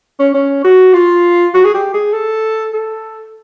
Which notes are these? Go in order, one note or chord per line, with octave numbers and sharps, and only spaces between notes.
C#4
C#4
F#4
F4
F#4
G#4
G4
G#4
A4
A4